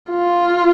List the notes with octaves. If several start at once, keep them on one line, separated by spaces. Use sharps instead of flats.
F4